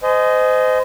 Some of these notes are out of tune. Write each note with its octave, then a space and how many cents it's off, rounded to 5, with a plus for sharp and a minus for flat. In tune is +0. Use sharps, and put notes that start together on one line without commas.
C5 -30 D#5 +0 G#5 +25